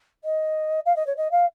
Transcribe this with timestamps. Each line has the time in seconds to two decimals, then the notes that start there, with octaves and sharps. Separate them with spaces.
0.24 D#5
0.86 F5
0.96 D#5
1.06 C#5
1.17 D#5
1.31 F5